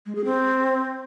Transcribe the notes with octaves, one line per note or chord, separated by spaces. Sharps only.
G#3
G#4
C4